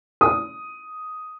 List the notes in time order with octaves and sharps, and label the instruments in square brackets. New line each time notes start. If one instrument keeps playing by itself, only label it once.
[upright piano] D#6